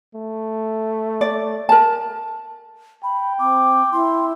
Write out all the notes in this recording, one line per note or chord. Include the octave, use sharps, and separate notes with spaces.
A3
D5
A#4 A5
G5 B5
C4 D6
E4 C6